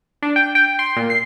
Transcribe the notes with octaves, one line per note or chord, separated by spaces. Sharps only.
D4
G5
G5
C6
A#2
C7